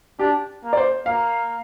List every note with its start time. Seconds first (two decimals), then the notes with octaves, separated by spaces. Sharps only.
0.19 D4 G4
0.64 A#3
0.73 D5
0.77 C5
1.06 A#3 F5